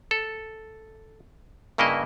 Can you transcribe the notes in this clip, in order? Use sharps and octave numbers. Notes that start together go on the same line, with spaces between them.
A4
G2 C#3 A#3 E4 B4 D#5